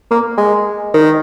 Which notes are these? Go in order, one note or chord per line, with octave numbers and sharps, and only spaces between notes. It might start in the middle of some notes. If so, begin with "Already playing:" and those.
A#3
G#3
D#3